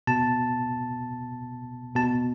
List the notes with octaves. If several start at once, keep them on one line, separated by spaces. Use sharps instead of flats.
B2 A5
B2 A5